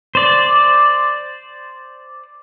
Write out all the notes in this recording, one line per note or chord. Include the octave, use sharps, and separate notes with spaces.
C5 D5